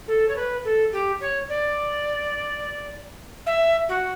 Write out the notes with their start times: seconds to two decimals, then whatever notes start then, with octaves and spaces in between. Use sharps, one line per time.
0.08 A4
0.29 C#5
0.36 B4
0.64 A4
0.92 G4
1.21 C#5
1.49 D5
3.46 E5
3.89 F#4